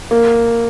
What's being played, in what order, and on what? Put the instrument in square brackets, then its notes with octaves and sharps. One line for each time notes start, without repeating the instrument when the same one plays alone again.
[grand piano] A#3